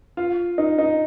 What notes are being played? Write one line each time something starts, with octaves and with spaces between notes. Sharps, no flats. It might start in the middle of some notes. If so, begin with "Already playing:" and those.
F4
D#4
D#4